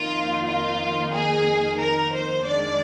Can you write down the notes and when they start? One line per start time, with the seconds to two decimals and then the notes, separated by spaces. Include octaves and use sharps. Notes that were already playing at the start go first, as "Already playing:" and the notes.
Already playing: F2 D#3 A#3 D#4 F4
0.45 F4
1.12 G#4
1.80 A#4
2.12 C5
2.45 F2 D#3 G#3 D4 D5